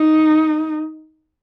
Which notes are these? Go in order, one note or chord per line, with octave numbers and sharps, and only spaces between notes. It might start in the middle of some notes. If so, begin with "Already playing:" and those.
Already playing: D#4